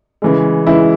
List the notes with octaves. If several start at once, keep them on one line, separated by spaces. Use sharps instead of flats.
C#3 E3 G#3
C#3 E3 G#3 E4